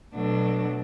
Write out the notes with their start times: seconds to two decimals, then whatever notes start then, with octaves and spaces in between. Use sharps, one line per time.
0.14 B2 F#3 A3 D4